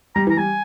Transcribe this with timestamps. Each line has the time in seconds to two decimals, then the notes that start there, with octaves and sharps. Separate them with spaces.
0.15 G3 A#5
0.27 E3
0.30 A#5
0.37 G3 G#5